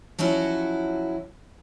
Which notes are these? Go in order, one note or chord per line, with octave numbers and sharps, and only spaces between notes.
F3 F#3 C#4 E4 F#4